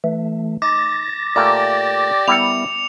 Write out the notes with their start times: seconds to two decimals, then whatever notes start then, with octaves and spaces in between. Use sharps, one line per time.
0.04 E3 A3
0.62 D#4 D6 A6 A#6
1.36 A#2 A3 A#3 G4 D5 D6
2.28 G3 B3 E4 A#4 C#7 F7